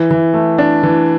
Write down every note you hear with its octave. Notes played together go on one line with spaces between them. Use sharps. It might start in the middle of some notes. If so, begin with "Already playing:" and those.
Already playing: E3
E3
A3
D4
E3